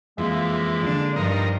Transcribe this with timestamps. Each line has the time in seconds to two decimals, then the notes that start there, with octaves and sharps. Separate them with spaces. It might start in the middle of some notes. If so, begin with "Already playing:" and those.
0.18 F2 E3 G#3 A#3
0.82 D3 D4
1.16 G2 F3 D#4 A#4